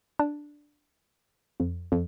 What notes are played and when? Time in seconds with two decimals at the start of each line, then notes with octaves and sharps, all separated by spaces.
0.19 D4
1.60 F2
1.92 F2